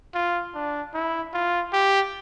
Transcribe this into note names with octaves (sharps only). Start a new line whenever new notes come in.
F4
D4
E4
F4
G4